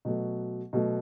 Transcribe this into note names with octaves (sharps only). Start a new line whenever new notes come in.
B2 F#3 A3
B2 F#3 A3